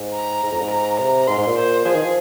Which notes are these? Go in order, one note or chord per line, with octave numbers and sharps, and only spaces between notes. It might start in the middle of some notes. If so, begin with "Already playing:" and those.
Already playing: G#2
A#5
G#2
F2
G#2
A#5
C3 A#5
G#2 C6
G#2
A#2
C5
F3 G#4
D#3
F3